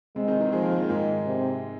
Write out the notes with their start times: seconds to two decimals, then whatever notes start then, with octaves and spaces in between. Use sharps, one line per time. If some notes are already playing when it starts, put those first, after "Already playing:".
0.16 C3 G#3 C4
0.28 D#3 D#4
0.40 D#3 D#4
0.52 F3 G#3 G#4
0.62 A#3 A#4
0.71 G#3 G#4
0.80 F3 F4
0.89 G#2 D#3 G#3
1.26 C3